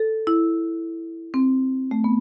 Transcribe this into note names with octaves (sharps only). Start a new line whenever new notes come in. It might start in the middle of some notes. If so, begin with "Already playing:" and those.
Already playing: A4
E4
C4
A3
B3